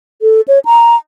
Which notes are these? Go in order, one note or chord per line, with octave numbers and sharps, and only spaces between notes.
A4
C#5
A#5